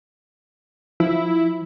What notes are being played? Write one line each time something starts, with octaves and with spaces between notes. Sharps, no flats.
F3 E4